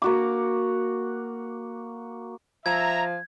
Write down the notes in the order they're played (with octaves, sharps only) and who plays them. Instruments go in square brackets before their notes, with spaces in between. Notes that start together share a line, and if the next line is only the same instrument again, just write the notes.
[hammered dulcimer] A#3 F#4 D6
[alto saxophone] F3 [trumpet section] E5 A#5 [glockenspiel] G#6